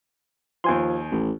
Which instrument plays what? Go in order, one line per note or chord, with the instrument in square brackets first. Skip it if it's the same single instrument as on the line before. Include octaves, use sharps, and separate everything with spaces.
[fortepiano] D#2 G#5 C6 [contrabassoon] F3
[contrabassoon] A1